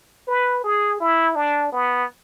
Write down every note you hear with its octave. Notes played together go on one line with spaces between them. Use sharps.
B4
G#4
E4
D4
B3